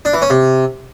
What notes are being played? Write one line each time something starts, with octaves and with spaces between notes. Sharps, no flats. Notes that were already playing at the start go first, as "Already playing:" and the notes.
D4
E3
C#4
C3